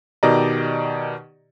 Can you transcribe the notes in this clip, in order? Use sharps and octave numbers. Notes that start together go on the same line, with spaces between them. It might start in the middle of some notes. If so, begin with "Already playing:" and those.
B2 D#3 G4 D5 D#5 A#5